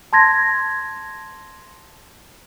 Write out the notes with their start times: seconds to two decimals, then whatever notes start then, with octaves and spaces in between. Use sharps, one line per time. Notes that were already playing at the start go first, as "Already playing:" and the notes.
0.13 A5 C6 G#6 A#6